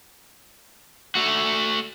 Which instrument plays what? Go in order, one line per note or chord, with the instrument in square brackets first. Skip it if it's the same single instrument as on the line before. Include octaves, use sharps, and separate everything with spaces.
[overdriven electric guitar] A3 F#4